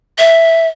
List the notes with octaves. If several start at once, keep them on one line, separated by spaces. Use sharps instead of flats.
E5